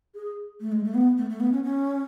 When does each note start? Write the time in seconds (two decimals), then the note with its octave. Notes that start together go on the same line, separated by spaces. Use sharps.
0.15 G#4
0.61 A3
0.72 G#3
0.84 A3
0.94 B3
1.18 A3
1.30 A3
1.40 B3
1.52 C#4
1.64 C#4